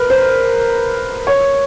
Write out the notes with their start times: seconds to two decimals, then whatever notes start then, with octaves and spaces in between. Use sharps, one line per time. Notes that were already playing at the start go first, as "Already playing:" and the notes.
Already playing: A#4 B4
0.10 C5
1.27 C#5